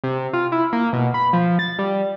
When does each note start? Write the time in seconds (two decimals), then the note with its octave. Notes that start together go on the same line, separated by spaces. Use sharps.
0.04 C3
0.33 F4
0.52 E4
0.73 A#3
0.93 B2
1.14 B5
1.33 F3
1.59 A6
1.79 G3